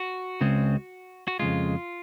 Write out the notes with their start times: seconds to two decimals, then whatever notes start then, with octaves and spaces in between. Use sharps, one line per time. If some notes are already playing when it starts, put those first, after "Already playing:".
Already playing: F#4
0.41 C#2 C#3 G#3 C4
1.28 F#4
1.39 F2 C#3 G#3 F4